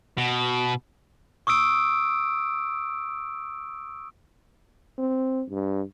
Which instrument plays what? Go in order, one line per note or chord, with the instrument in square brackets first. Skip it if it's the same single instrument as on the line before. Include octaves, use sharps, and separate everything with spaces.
[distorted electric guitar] B2
[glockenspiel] C#6 D#6 E6 D7
[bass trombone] C4
G2